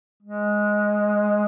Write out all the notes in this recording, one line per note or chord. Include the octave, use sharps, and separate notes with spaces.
G#3